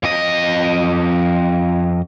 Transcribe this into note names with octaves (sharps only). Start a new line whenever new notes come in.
F2 D#5